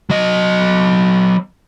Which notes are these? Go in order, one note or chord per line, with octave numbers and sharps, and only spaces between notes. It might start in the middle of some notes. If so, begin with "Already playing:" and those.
F#3 D#5